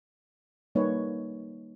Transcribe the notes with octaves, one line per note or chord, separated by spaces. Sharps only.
G3 A#3 D#4 B4 C#5